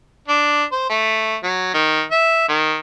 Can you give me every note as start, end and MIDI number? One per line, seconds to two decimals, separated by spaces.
0.28 0.64 62
0.72 0.88 72
0.90 1.36 57
1.43 1.73 54
1.74 2.03 51
2.11 2.46 76
2.48 2.77 51